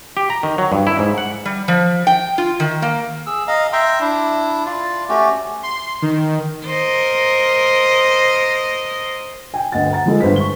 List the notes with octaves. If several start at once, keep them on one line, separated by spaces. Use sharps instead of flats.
G4
A#5
D#3
F#3
G2
E4
G#2
F#5
G3
F3
G5
F4
D#3
A#3
G#4 E6
D#5 F5 A#5
E5 G5 A#5 C6
D4 E4
F4 D5
A3 C#4 F#4 G4
C6
D#3
A#4 C5 D#5
G5 G#5
G1 D2 D#5 F#5 A6
F#5 A#5 A6
F3 G#3 A4
G1 G3 B4 C5 B6
C#6 G7